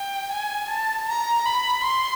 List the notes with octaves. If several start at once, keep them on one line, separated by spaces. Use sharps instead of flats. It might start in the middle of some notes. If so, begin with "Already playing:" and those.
Already playing: G5
G#5
A5
A#5
B5
C6